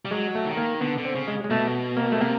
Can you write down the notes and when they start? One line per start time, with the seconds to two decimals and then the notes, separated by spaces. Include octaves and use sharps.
0.05 G3
0.11 F#3 G#3
0.35 A3
0.46 D#3
0.57 A#3
0.80 D3 B3
0.98 D3
1.05 C4
1.15 C#3
1.28 G#3
1.44 G#3
1.50 B2 A3
1.97 A#3
2.12 A3
2.20 C3 A#3